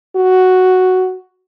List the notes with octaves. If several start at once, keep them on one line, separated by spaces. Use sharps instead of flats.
F#4